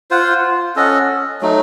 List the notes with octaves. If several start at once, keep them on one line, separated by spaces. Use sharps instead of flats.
F4 C5 F#5
C#4 A4 D#5 F#5
F#3 A3 D#4